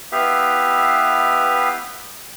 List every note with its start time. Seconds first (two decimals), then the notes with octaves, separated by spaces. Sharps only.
0.12 B3 E4 G4 B4 E5 F5